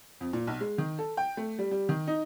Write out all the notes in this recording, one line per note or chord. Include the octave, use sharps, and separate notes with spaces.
F2
A#2
B1
G#3
D#3
A4
G5
A3
G3
G3
D#3
D#4